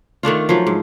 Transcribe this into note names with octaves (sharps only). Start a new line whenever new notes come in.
D#3 A3 D4 F4
F3 F#3
G#2